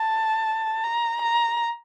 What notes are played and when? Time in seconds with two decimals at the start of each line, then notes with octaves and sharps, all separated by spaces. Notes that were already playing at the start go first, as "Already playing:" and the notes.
Already playing: A5
0.84 A#5
1.22 A#5